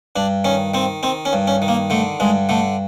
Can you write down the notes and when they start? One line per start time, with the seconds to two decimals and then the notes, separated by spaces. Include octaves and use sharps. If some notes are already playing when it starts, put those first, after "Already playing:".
0.16 G2 D4
0.45 D#3 C#4
0.74 D#3 C4
1.03 D#3 C4
1.25 C#4
1.33 G2
1.47 C#4
1.62 D#3
1.68 A#3
1.90 D3 A3
2.20 G2 G#3
2.49 D3 A3